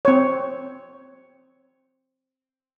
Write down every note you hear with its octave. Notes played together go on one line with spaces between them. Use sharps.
C4 C#5